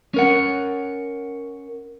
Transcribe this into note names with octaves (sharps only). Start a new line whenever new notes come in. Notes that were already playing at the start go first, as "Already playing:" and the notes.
C#4 A#4 F#5